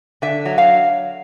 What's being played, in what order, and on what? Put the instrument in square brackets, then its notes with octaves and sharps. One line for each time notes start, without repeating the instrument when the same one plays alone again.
[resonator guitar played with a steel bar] D3 E5
F#3
F5